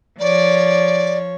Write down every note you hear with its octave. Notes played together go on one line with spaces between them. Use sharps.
F3 C#5 D5